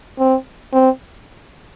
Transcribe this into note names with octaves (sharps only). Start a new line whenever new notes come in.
C4
C4